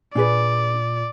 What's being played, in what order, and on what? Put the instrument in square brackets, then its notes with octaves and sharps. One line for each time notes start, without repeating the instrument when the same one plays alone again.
[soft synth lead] A#2 [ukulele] D4 G#4 B4 [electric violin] D5